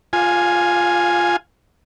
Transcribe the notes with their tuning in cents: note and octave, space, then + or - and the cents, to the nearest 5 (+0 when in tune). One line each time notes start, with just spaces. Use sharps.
F4 +0 F5 +25 G#5 +0